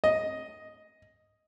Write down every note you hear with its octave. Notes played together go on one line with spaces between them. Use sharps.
D#5